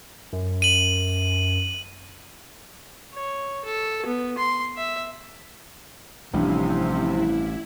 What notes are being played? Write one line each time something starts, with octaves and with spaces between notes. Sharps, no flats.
F#2
D#7 F#7
C#5
A4
B3
C6
E5
A1 G2 C3 F3 E4